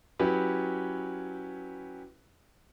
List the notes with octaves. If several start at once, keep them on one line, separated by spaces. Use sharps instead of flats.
F#3 C#4 E4 G4 B4